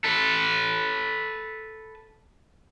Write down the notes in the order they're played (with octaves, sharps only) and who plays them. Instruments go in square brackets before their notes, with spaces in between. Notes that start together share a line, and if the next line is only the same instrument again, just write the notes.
[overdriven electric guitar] A4 B4